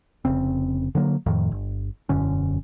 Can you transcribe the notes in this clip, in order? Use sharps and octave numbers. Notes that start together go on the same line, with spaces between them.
F1 C#3 C4
D3 F#3 A#3
F2 A2 D#3 F3
G1
E1 F#2 D3 C#4